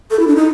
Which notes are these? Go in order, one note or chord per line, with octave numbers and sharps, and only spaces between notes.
A4
E4
D4
D#4